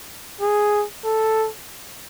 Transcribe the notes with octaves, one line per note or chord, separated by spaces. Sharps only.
G#4
A4